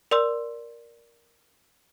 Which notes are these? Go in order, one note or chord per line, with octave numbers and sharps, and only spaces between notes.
A#4 D5 C6 E6